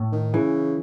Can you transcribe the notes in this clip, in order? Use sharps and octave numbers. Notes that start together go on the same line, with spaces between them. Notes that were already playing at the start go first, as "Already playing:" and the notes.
Already playing: A2
D#3
C#3 E3